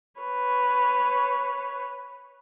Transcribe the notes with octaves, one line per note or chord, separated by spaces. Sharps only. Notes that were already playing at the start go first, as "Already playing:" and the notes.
B4 C#5